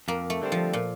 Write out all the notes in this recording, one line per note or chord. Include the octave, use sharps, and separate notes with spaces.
F2 A#3
A3
D3 G3 C4
F3
A#2